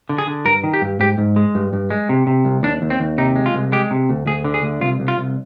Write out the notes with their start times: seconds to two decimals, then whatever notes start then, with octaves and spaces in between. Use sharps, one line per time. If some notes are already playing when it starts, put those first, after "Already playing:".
0.09 D3
0.18 G#4
0.27 D3
0.45 G2 A#4
0.64 D#3
0.74 G4
0.82 G2
1.00 G#2 G4
1.18 G#2
1.36 G#3
1.55 G2
1.73 G2
1.90 G#3
2.09 C3
2.27 C3
2.45 C2
2.63 D#2 D4
2.82 D#2
2.90 C4
3.00 D#2
3.18 C3 D#4
3.36 G#3
3.46 F4
3.54 C2
3.72 G#3 G4
3.91 C3
4.09 D2
4.27 D2 G#4
4.44 D3
4.54 G#4
4.63 D2
4.81 C2 F4
5.00 C2
5.08 F4
5.18 C2